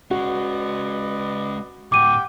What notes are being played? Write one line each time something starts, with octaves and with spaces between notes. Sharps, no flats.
G#3 C#4 F#4 B4 D5 D#5
D2 A2 G4 F#5 G5 D6 D#7